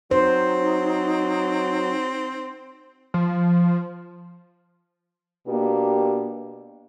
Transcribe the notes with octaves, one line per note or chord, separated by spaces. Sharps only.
F#3 C4 D#4 C5
F3
B2 A#3 D4 G4